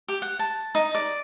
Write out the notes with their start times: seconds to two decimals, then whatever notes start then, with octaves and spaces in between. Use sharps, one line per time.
0.08 G4
0.22 F#5
0.39 A5
0.75 D#4
0.95 D5